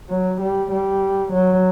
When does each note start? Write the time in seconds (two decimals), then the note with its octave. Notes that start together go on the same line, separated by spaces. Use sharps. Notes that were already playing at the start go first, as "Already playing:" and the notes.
0.09 F#3
0.41 G3
0.72 G3
1.32 F#3